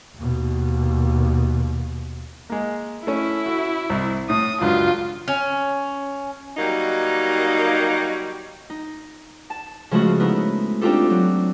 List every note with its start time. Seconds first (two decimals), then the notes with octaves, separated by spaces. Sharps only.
0.16 D#2 B2
2.50 G#3 A#3
3.07 A3 C#4 E4
3.46 F#4
3.90 C2
4.30 A2 D#6
4.61 C#2 F#2 D4 F4
5.28 C#4
6.57 F#3 G3 A#3 D#4
8.70 D#4
9.50 A5
9.91 C#3 F3 G#3 A3 C#4 F#4
10.20 B3 D#4 E4
10.81 C4 D4 D#4 F4 G4 A4
11.10 F#3